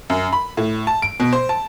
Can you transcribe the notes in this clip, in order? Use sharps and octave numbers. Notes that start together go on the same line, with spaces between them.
F#2
B5
A2
A5
D7
B2
C5
A5